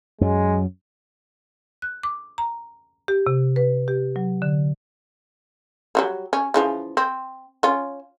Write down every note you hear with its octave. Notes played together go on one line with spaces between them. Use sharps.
F#2 F#3 G#3
F#6
D6
A#5
G4
C3
B4
G4
F#3
D3
F#3 G3 A#3
C#4
C#3 E3 F3
C4
C#4 F4